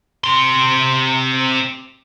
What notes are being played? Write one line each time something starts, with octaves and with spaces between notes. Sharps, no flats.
C3 C6